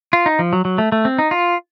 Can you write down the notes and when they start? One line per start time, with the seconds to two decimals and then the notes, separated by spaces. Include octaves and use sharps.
0.13 F4
0.26 D#4
0.39 F3
0.53 F#3
0.65 F#3
0.78 A3
0.92 A3
1.05 C4
1.19 D#4
1.31 F4